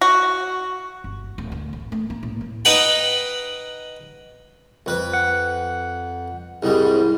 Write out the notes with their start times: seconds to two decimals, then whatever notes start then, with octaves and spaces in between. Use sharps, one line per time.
0.01 F#4
1.04 G1
1.38 D1
1.52 D2
1.73 A1
1.92 A3
2.10 A#3
2.23 A2
2.41 A#3
2.65 D#4 B4 F#5 G5 A#5 B5
4.86 F2 B4
5.13 F#5
6.63 C2 G#2 G3 E4